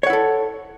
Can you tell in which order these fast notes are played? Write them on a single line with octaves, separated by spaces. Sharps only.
C#5 F#5 E4 A4